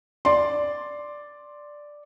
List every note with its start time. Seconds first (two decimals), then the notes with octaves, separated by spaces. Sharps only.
0.25 D5 C6